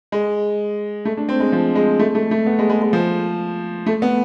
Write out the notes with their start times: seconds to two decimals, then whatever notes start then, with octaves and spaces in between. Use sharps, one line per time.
0.12 G#3
1.05 A3
1.17 D4
1.29 C4
1.40 G#3
1.52 F3
1.75 G#3
1.99 A3
2.15 A3
2.31 A3
2.46 B3
2.59 G#3
2.69 G#3
2.82 G#3
2.93 F3
3.86 A3
4.02 B3